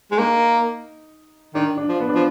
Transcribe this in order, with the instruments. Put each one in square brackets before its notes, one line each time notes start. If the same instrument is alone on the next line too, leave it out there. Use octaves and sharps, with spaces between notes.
[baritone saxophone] G#3
[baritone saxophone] A#3 [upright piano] D#4
[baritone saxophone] D#3 [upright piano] D4
[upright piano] D4
[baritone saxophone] F3
[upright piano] B3
D4
[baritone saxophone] F3